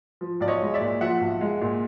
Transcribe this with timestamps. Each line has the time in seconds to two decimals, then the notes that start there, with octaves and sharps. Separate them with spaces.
0.21 F3
0.40 B1 D5
0.48 C#5 D#5
0.62 G#3
0.74 D5 E5
0.81 A#2
1.01 F3 E5 F#5
1.21 B1
1.41 G#3
1.61 A#2